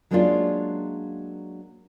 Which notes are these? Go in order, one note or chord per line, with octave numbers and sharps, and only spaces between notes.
F#3 G#3 A#3 C#4 D4 F4